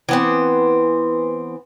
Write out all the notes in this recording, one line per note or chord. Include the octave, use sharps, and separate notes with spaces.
E3 B3 C4